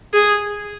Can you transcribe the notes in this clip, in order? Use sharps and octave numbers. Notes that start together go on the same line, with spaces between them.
G#4